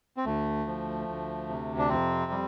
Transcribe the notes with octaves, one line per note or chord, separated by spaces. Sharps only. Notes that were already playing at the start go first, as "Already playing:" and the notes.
C4
D2 A3
F3
D2
C3
D4
F2 C4
G3